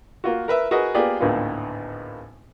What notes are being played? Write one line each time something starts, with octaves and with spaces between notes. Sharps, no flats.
A#3 F4 F#4
A#4 B4 E5
F#4 G#4 A#4 B4 D#5
A#3 B3 F4 G4 G#4 D5
G#1 D2 A2 A#3 B3 F4